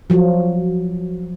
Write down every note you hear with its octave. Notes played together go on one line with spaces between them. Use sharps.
F3 F#3